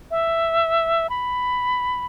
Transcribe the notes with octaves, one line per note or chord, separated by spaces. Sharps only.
E5
B5